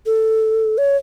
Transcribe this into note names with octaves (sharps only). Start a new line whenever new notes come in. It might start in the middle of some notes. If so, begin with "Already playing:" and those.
A4
C#5